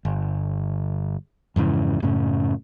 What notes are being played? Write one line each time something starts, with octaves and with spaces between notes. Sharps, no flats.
G1
F2 G#2 C#3 E3
F#2 A2 C#3 C#4